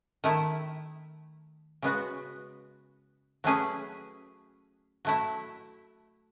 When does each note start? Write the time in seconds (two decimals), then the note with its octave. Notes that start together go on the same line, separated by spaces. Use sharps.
0.24 D#3 A3 E4
1.82 C#3 G#3 B3 F#4 B4
3.44 F#3 A3 C#4 G#4 B4
5.05 F#3 A3 E4